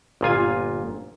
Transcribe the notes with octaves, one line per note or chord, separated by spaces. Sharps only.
G1 A#2 F4 G#5